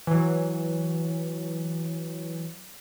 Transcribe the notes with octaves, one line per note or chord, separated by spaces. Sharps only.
E3 F#3